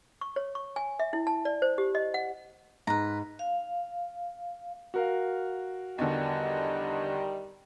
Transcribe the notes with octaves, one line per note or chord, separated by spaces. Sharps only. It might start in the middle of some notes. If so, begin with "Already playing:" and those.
C#6
C#5
C#6
G#5
E5
E4
A5
D5
C5
G4
D#5
F#5
G#2 B4 A#5
F5
F#4 A#4 F5
E2 D3 D#3 G3 D#5